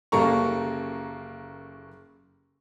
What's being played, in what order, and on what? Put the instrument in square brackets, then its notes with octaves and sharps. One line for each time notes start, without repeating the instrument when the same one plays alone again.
[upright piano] F#1 G3 A#3 A4 A#5 C#6